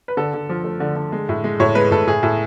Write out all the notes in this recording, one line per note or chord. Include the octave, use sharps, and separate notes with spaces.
B4
D3 A4
D3
F3
A3
D3
D3
G#3
A2
G#3
A2 C#5
G#3 B4
A2 A4
A2 G#4
A2